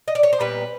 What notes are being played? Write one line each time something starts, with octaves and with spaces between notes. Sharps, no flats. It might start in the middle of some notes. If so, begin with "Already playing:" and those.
D#5
D5
C#5
C5
A#2 G3 B3 B4